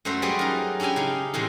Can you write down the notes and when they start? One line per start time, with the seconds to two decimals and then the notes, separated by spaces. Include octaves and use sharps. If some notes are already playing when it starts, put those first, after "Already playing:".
0.05 F#2 A3 F#4 C5 E5
0.22 F#3 G3 G#4 B4 D5
0.39 D#4 A#4
0.80 C#4 D4 E4 G4 G#5
0.96 C#3 D#4
1.34 A2 C3 E3 G#3